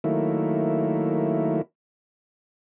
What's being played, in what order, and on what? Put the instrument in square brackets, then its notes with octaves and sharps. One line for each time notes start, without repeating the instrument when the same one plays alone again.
[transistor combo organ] D#3 F#3 A3 A#3 E4